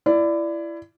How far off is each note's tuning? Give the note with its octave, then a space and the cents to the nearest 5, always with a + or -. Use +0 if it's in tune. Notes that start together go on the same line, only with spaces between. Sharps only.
E4 +25 D5 +0